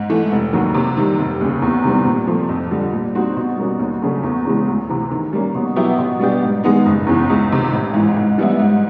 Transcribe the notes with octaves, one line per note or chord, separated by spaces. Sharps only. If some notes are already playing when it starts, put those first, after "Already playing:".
Already playing: G#2
E3 A3
F1
D#2 D#3 F#3
C3
D#3 G3
F1
D#2 C#3
E2
C3 D#3 G3 C4
A#2
F3 A3 C4
F2
D3 G3
A#2
G3 C4 D#4 F#4
B2
G3 A#3 C#4 F#4
D#2
C#3 F#3 A3 D4
E2
C#3 E3 G#3
D2
C3 E3
D#3
G3 A#3 C#4
B2
F#3 B3 E4 G4
B2
G3 B3 D4 G4
G#2
D#3 G#3 B3 D#4
F#1
E2 C#3 E3
C#2
C3 D#3
A1
G#2 E3
G#2
E3 G3 B3 E4
G#2